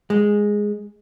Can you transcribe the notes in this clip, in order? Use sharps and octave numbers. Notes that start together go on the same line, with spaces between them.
G#3